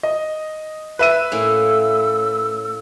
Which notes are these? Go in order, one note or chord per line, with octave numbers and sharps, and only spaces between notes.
D#5
B4 E5 F#6 D#7
A2 A#3 C#4 E6